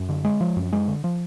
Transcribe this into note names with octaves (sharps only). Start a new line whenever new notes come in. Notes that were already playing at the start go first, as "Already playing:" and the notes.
Already playing: F#2
D3
G#3
F3
F#2
G#3
D3
F3